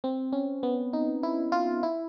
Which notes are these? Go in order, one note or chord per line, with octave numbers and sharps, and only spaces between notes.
C4
C#4
B3
D#4
E4
F4
E4